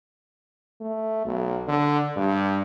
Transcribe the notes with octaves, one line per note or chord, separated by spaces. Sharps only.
A3
B1
D3
G2